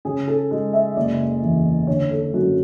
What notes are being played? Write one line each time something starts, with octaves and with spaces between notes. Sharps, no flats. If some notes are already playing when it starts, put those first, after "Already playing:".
C#3 G#4
A4
G#3
E5
F#1 D5
E2
D3 C#5
A4
F#2 F#4